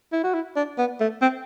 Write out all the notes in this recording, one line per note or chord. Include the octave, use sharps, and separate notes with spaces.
E4
F#4
E4
D4
B3
A3
C4